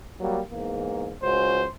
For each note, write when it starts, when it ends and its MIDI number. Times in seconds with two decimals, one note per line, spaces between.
0.20 0.39 54
0.20 0.39 55
0.20 0.39 58
0.51 1.12 40
0.51 1.12 44
0.51 1.12 58
1.23 1.63 37
1.23 1.63 61
1.23 1.63 66
1.23 1.68 72